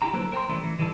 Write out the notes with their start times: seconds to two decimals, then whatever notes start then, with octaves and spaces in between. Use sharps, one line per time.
0.02 E4 F4 G4 G5 A#5
0.13 D3 F#3 A#3 A4 B4 C5
0.32 A#4 C5 G5 A5 A#5 C6
0.49 E3 G3 A3 C#4 E4
0.64 E3
0.79 D#3 E3 G3 E4 A4